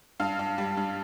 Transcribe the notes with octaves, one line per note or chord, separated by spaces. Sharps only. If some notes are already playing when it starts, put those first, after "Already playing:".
G2 F5
G2
G3
G2